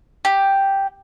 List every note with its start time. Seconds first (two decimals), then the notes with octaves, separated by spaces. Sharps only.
0.25 G4